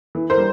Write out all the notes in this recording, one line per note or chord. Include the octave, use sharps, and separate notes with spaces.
E3
A#4 C5
G3